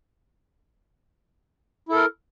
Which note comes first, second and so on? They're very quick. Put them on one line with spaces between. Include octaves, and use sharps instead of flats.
E4 A4 A#4